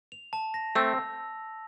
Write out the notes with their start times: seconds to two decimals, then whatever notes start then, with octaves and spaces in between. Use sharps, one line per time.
0.12 F7
0.33 A5
0.54 A#6
0.75 A3 C4 E6